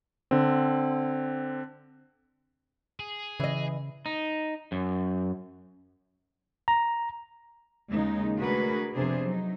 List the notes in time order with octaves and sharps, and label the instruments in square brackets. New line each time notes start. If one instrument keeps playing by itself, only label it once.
[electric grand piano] D3 C4
[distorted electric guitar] G#4
[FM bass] C#3 [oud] E3 D#5
[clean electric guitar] D#4
F#2
[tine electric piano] A#5
[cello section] D#2 C#3 G#3 D#4
A3 D4 F#4 G#4 A#4 B4
F2 C3 B3 D4 G#4 C5
F#3 D#4